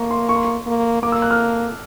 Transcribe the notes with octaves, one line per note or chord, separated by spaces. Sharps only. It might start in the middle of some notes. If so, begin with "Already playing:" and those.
Already playing: A#3 A#5 C#6
C6
C#6
C6
C#6
A#3
A#3 D6
E6
F#6
F6